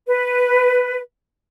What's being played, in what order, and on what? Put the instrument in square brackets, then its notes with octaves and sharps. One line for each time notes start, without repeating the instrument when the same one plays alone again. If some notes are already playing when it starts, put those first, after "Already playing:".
[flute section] B4